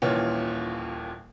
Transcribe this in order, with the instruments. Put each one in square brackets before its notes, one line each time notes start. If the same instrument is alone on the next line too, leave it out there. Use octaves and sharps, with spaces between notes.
[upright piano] D#1 D#2 A#2 E3 C#4 F4